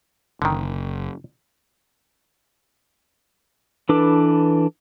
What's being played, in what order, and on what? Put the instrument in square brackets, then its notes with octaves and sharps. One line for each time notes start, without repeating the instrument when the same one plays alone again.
[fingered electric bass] F#1 [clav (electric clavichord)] D3 D#3
[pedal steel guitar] E3 D4 A4 B4 D6